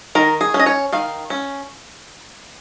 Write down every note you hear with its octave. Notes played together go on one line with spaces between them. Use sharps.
D#3 A#4
G#4
C#4
D#5
C#5
D#3 F5
C#4